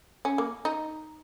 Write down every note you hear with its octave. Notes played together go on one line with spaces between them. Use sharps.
C#4
A#3
D#4